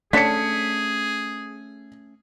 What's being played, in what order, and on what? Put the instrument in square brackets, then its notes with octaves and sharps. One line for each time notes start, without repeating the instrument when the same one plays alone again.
[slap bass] A3 C#4 [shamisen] D4 A4 C#5 [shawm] G#4 [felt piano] B6 C#7